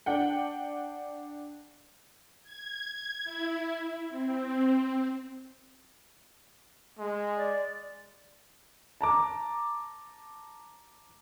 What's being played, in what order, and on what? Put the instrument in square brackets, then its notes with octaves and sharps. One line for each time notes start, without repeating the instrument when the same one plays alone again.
[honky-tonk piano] D4 F#5 G5
[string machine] G#6
E4
C4
[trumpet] G#3
[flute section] D5
[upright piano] A5 A#5 D6